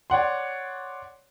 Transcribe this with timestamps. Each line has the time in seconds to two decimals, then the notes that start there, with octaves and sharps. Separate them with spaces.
0.10 C#5 D5 F#5 C6